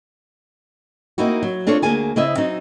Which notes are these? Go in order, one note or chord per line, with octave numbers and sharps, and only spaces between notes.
A#3 C4 D#4 E4 F#4
F#3
C4 D4 F4 A4 C#5
D2 G#2 A#3 G#4 G#5 A5
C#3 C4 E4 D#5 E5
F#3 C4 D#4